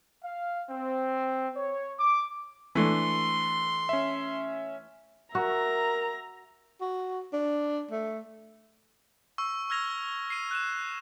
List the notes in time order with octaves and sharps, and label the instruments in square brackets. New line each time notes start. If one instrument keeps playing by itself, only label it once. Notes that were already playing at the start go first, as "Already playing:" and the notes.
[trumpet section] F5
C4
C#5
D6
[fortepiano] E3 A3 D4 [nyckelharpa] C6
[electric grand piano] C#4 E5
[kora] F#4 [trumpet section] A#4 [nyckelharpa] E5 [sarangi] A#5
[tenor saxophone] F#4
D4
A3
[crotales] C#6 E6
E6 F6 G#6 A#6 F7
C7 D#7
F#6 D#7 E7